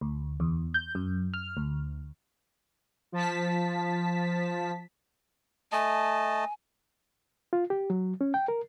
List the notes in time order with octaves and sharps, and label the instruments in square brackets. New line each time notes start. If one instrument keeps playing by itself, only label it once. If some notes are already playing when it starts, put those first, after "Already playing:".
[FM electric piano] D2
E2
G6
F#2
F6
D2
[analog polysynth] F3 A5 B6
[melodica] A3 D#5 A5 [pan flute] G#5
[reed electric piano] F4
G4
F#3
C#4
G5
A#4